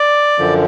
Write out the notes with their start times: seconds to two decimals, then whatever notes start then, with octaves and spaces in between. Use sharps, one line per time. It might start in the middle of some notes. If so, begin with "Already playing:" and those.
Already playing: D5
0.38 F#2 D3 F3